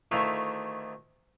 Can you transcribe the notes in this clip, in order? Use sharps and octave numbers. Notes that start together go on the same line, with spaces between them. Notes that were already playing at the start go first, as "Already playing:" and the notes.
D2 D#3 A3 E4 E5 F5